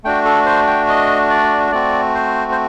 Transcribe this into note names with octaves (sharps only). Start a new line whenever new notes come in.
A3 D4 F#4 G5
A4
C5
G5
D#5
D5
A3 C4 F#4 D5
C5
C5